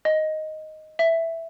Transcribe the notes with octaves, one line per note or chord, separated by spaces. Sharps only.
D#5
E5